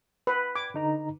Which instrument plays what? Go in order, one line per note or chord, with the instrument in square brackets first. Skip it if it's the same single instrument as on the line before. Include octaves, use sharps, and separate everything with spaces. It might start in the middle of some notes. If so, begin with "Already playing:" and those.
[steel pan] B4
[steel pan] D6 [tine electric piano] G#6
[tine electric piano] D3 D#4 A#5